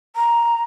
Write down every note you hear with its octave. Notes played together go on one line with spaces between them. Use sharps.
A#5